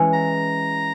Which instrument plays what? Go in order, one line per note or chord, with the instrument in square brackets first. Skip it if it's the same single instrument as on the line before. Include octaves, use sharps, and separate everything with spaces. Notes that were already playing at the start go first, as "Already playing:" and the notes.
Already playing: [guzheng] E3 G#3 C#4
[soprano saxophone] A#5